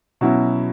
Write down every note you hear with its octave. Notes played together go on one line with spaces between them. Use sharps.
B2 F#3 C#4 E4